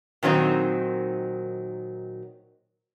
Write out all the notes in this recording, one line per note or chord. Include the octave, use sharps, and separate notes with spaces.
A#2 D#3 F#3 C4 D#4